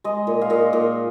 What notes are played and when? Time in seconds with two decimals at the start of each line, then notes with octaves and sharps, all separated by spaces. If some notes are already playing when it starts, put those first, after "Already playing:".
0.04 G#3 D#5
0.27 A#2
0.41 F5
0.50 A#2 D#5
0.73 A#2